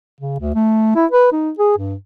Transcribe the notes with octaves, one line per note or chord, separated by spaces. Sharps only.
C#3
D2
A3
E4
B4
D#4
G#4
G2